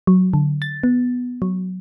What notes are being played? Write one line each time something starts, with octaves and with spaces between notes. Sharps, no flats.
F#3
D3
A6
B3
F#3